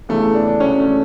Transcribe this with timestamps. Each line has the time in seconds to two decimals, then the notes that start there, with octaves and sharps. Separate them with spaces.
0.09 E2 C#3 E3 A3
0.35 D4
0.48 D4
0.60 E2 B2 C#4
0.78 A3